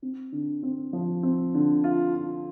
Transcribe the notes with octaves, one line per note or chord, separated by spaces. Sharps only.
C4
D3
C4
F3
C4
D3
F4
F4